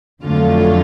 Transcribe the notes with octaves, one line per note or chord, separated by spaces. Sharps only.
F2 D3 F#3 A3 F4